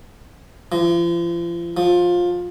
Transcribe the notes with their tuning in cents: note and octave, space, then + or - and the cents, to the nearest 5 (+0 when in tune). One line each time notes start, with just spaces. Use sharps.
F3 -40
F3 +15